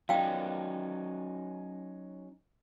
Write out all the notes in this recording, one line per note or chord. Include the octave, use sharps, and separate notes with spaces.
F#3 C#4 D#4 F5 G5